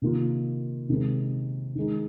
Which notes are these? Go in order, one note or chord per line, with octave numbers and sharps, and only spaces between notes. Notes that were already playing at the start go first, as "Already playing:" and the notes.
C3 D#3 A#3 F4
C3 D#3 G#3 C4
D#3 G#3 D#4